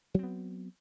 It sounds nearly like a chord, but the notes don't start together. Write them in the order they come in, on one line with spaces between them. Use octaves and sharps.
F#3 C4 B3